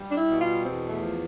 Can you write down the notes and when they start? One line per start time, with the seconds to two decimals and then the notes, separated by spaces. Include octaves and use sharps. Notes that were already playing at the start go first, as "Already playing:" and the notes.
Already playing: G3
0.11 D4
0.17 E4
0.29 B2
0.41 F4
0.65 E2 C4
0.89 A3
1.01 F3